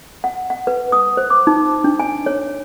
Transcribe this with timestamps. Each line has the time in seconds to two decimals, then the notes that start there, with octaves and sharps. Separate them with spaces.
0.24 F#5
0.50 F#5
0.67 B4
0.92 D#6
1.17 C5
1.30 D6
1.47 D#4
1.84 D4
2.00 G#5
2.26 C#5